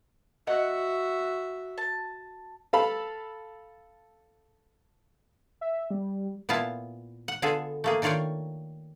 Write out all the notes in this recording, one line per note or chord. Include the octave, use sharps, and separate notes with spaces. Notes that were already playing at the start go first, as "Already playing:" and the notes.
F#4 D#5 E5 F#5
A5
A4 F5 A5 B5
E5
G3
A#2 B3 E4 F4 A5
F#5
D3 B3 F4 G#4 A4
A3 A#3 G#4
D#3 D4 F4 C#5 F5 G5